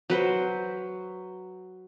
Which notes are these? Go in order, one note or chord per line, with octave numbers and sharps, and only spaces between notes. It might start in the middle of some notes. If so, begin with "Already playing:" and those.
F#3 B4 C5